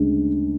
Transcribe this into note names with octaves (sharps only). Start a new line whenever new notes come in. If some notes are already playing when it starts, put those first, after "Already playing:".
Already playing: D2 C#3 G#3